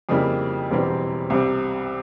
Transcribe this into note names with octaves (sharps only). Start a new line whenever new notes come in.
F2 C#3 G3 A#3 E4
E1 E2 E3 G3 C4
C2 C3 G3